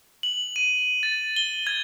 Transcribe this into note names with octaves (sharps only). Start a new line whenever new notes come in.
F#7
D#7
A6
G7
G#6